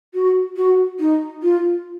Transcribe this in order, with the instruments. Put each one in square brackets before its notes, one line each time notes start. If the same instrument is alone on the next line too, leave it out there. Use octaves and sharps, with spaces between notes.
[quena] F#4
F#4
D#4
F4